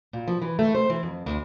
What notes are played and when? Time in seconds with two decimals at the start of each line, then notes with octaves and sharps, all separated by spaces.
0.13 A#2
0.28 F3
0.42 E3
0.59 A3
0.75 C5
0.90 E3
1.03 F2
1.26 D2